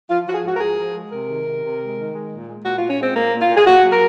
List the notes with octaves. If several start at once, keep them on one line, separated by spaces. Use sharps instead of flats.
F3 F4
F3 F#4
G#4
G#2 F#4
A#4
F3 G#4
F3
G#3
C3 A#4
D#3
C3
C3
G#3
D#3
G#3
A#2
G#3
A#2 F#4
A#2 F4
C#4
G#3 C4
A#2 A#3
A#2
F4
A#2
G#4
A#2 F#4
F#3
A#4